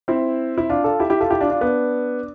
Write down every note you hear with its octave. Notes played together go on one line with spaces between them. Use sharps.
C4 E4
E4
D4 F4
F4 A4
E4 G4
E4 G4
F4 A4
E4 G4
D4 F4
D4 F4
B3 D4